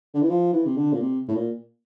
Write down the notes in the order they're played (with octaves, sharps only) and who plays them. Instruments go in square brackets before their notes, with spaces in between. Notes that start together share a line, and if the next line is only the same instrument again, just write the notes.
[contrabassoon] D3
E3
F3
E3
C3
D3
A#2
C3
A2
A#2